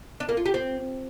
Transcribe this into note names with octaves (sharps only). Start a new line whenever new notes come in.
D4
A#3
F4
G4
C4